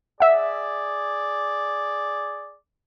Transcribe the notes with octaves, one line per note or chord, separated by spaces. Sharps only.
G#4 D5 E5 F#5